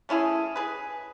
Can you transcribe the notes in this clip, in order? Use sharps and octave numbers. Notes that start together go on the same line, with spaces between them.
A3 C#4 E4 G#4
G#4 B4